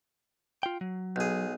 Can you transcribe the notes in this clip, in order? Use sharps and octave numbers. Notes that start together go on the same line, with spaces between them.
F4 G5
F#3
B1 G#4